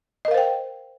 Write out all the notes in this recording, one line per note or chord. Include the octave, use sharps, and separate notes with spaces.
A#4 C5 D#5 F5 G5